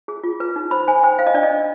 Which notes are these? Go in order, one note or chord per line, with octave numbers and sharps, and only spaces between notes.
G#4
F4
B4
D#4
C5 B5
C5 G#5
C5 G5
C5 F5
D#5
D4 D5
D#5
D4